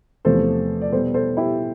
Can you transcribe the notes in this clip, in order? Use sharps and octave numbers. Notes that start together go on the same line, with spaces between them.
E2 C3 F3 A3 A4 C5
D5
B2 G3 A4 C5
A4 C5
E4 G4